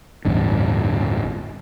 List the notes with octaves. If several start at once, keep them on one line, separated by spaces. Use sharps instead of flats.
A1 E2 G2 D3